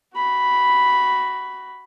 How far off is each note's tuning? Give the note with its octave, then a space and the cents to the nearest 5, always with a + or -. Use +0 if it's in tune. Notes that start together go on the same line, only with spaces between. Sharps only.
F#4 +20 B5 +0